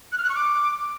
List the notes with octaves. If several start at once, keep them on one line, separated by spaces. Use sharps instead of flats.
F#6
F6
F#6
C#6
D6